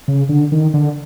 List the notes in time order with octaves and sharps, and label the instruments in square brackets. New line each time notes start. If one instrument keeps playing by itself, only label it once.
[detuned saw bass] C#3
D3
D#3
D3